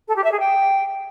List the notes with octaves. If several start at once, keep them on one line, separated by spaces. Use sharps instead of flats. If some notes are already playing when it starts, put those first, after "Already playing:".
A4
G4
E5
G#4
G5